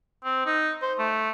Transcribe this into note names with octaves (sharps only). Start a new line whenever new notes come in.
C4
D#4
C5
A3